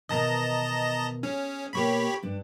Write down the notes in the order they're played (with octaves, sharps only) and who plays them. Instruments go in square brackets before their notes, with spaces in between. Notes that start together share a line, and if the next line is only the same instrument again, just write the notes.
[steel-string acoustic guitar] E2 B2 D#3 [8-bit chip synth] D#5 A5 A#5
[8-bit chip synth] C#4 [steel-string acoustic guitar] G#4
[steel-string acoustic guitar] B2 A#3 [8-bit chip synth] G4 C#5 B5
[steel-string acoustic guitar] G2 D4